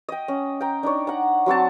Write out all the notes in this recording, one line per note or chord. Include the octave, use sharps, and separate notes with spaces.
D#5 G5
C#4
G5 A#5
D4 D#4 C#5
F#5 A#5
F#3 C4 F#4 A5